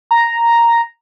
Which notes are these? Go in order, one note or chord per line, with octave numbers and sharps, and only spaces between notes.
A#5